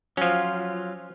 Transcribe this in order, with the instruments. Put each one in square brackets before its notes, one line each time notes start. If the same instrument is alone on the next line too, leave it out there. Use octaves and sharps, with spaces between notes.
[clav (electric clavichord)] F3 C#4 [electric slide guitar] F#3 F4